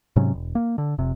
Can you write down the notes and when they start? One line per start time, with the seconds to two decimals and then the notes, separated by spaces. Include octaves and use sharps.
0.16 G#2 C3 F#3 C#4
0.34 E1
0.55 A#3
0.78 D3
0.98 F1 C3